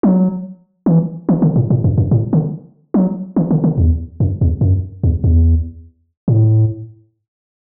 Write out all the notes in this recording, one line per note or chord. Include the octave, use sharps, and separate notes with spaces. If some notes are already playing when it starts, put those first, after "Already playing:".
F#3
E3
E3
D3
A2
A2
F#2
F#2
A2
D3
F#3
E3
D3
D3
E2
F#2
E2
F#2
E2
E2
A2